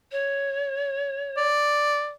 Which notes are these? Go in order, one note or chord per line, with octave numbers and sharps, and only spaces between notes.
C#5
D5